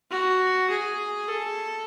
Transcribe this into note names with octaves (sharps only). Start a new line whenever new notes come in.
F#4
G#4
A4